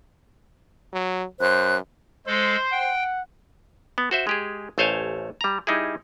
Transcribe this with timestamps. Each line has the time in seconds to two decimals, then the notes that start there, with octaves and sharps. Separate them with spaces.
0.93 F#3
1.40 F#2 C5 F#6
2.27 G#3 A4 C5
2.72 F#5 G5
3.98 B3
4.11 F#4 C5 E5
4.27 G#3 G4 G#4
4.78 A1 A3 C5 C#5 F5 G#5
5.41 G3 A#5
5.67 G3 D#4 E4 G#4